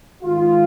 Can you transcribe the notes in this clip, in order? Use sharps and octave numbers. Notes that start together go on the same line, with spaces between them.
G#2 D#3 G#3 F4